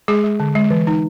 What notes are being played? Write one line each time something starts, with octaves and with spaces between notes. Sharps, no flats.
G#3 G#4
G#3
D3
G#3
E3
D#4